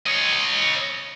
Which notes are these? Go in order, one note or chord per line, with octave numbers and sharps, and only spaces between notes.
C#5 D#5